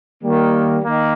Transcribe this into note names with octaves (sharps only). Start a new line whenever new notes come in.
D#3 G3 A#3
D#3 A#3